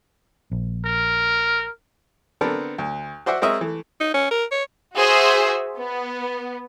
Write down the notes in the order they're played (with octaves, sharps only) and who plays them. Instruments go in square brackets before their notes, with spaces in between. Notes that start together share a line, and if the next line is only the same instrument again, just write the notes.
[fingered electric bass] A#1
[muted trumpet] A#4
[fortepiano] D3 B3 C4 D4 A4 A#4
D2
F#4 C5 D5 E5 F#5
G#3 C4 A#4 C#5 D#5 E5
E3 A3
[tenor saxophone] D#4
C#4
A#4
C#5
[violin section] F#4 G#4 C5 E5
B3